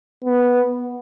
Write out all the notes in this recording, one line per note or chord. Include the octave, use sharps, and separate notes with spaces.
B3